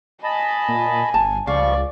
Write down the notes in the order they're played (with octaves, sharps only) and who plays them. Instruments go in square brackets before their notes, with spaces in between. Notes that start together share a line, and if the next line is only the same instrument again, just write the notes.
[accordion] D#5 A5 B5 [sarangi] G#5
[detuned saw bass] A#2
[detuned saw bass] G1 [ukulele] A5
[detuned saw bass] C#2 [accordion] F3 G3 C#6 [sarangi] D5 [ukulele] F5